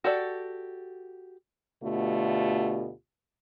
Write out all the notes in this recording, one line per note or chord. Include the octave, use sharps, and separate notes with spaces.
F#4 G4 A4 D5
D2 B2 D3 A3 F4 G4